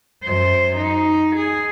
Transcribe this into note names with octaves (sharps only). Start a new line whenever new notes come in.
F#2 C5
D#4
G#4